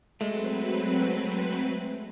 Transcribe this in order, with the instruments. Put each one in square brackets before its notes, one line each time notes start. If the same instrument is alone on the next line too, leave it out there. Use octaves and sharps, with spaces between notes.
[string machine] F#3 C4 B4 [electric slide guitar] G#3 A3